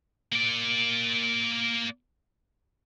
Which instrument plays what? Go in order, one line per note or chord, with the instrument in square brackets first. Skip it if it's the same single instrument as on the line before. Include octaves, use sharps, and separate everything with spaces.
[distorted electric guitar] A#3 D5